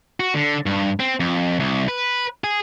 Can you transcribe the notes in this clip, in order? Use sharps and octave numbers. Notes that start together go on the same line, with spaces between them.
F#4
D3
G2
C4
F2
C2
B4
G#4